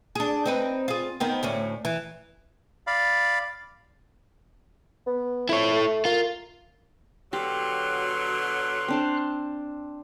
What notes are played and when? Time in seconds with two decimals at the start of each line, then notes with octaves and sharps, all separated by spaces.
0.15 D4 G#4
0.46 C4 D#4 B4
0.88 F4 G#4
1.20 D#3 B3 C4
1.43 D2 A2 C#4
1.85 E3
2.87 D5 F5 B5
5.06 B3
5.49 F2 E4 C#5
5.72 A3
6.05 F4 A#4
7.33 B2 D3 F#3 G4 C6 F6 F#6
8.88 C4 D4 C5